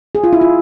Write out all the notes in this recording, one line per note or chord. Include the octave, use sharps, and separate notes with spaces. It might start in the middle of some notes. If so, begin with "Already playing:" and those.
G#4
F4
E4
F4